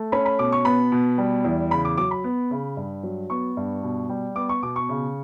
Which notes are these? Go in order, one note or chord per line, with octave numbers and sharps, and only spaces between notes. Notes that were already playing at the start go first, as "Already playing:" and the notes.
Already playing: A3
C#4 B5
B5
B2 D6
C#6
B3 B5
B2
G3
E2
C#3 B5
D6
F#3 D6
B5
B3
C#3
G2
F#3
B3 C#6
G2
B2
G3
B3 D6
C#6
B2 D6
C#6
C#3